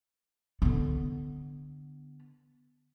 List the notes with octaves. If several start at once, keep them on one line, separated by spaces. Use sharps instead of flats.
D3 B3